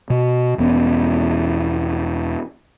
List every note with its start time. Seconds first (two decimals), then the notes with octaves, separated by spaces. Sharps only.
0.10 B2
0.58 E1 E2 B3 C#4